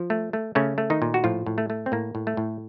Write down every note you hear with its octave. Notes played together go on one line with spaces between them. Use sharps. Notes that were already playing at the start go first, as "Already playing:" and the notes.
Already playing: F3
A3
A3
C#3 A3 C#4
A3
D#3 D#4
A#2
F#4
A2 F3 F4
A2
A3
A3
C4
A2 A#3
A2
A3
A2